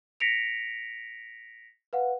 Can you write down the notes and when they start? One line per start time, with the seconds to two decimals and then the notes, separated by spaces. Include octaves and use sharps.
0.20 A#6 B6 C#7 D7 F7
1.93 B4 F5 F#5